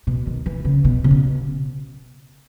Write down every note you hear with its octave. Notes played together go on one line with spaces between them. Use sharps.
B2
D#3
E3
C#3
B2
C#3
B2